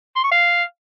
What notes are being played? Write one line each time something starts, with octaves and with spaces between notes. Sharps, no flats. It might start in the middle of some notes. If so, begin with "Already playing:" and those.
C6
C#6
F5